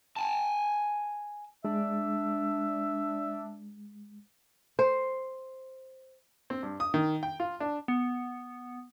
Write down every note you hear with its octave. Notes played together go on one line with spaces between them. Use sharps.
G#5 A5
G#3 D4 E5
C5
C4
G2
D#6
D#3
G5
F4
D4
B3